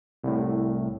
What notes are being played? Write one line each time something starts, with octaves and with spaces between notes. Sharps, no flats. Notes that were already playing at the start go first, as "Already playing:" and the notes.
C2 A2